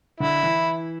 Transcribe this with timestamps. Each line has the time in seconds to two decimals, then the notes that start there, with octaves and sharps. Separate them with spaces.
0.20 D3 E4
0.43 E3